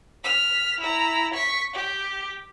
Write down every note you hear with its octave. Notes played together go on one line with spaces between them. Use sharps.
F6 B6
E4 A#5
C#6 B6
G4